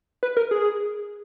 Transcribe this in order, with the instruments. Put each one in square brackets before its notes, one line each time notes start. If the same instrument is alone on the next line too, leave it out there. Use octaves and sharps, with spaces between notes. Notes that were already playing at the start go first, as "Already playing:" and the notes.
[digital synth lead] B4
A#4
G#4